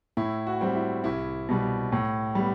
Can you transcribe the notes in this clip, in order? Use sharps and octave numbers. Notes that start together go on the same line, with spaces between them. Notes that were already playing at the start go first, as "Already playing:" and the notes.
A2 E4
F#4
G3 C4
E4
C2 E4
B2 G3
A2
G3 B3